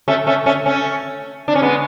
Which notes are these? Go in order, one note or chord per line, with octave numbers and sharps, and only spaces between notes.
A3 C#4
A3 C#4
A3 C#4
A3 C#4
D4
C#4
G#3 B3